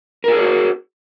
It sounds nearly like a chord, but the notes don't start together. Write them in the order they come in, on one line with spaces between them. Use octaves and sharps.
A#4 F4 G#4 C#5 F#4